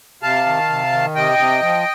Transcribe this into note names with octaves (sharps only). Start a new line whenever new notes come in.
C3 F5 A5
D#3
C3
D#3
C3 D#5 G5
C3
F3